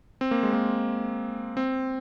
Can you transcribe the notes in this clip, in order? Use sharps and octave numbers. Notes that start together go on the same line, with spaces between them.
C4
A#3
G#3
A#3
C4